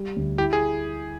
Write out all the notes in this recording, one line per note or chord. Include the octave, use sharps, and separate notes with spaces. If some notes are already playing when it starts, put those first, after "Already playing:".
Already playing: G3
D2
E4 G4
G#4